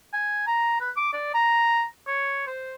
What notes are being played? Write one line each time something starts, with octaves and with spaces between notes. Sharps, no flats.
G#5
A#5
B4
D6
D5
A#5
C#5
C5